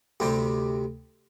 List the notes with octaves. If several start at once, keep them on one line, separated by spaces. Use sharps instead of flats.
D2 C3 G3 C4 G4